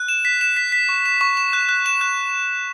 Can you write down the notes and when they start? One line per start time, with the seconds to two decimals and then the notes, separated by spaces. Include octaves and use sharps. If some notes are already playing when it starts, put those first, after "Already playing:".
Already playing: F#6
0.08 E7
0.25 B6
0.41 E7
0.57 B6
0.72 B6
0.89 C#6
1.06 E7
1.21 C#6
1.37 E7
1.53 F#6
1.69 F#6
1.86 E7
2.01 F#6